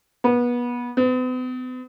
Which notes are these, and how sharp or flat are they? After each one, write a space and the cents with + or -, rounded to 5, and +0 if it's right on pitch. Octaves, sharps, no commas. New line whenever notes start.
B3 -25
B3 +45